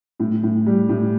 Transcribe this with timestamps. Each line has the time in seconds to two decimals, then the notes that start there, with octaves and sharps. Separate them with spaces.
0.20 A2
0.43 A2
0.66 G3
0.89 A2